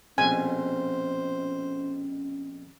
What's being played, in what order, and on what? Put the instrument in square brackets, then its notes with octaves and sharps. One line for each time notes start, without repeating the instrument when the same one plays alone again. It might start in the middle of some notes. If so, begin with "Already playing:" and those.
[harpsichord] A#1 F2 B2 [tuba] C#4 [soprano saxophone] C5 [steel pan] G#5